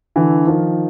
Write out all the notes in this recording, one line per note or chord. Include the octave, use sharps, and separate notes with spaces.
D3 E3
D#3 F3